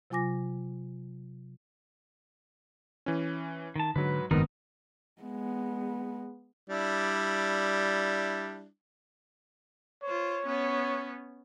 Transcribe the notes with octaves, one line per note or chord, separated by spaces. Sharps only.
C3 F#3 F4 G#5 D6 A#6
E3 C#4
D#3 A5
G#2 D3 F#3 B4
F#1 G#2 D#3 B3 C4 D#4 F#4 A#4
G#3 B3
G3 D4 E4
F4 C5 C#5
B3 C#4